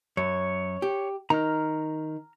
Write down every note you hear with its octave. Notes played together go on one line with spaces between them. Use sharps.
F#2 C#5
G4
D#3 A#5 F6